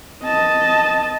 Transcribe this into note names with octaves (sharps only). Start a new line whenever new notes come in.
D#5 A5